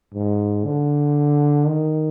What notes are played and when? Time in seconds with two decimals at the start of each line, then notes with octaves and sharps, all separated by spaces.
0.14 G#2
0.65 D3
1.67 D#3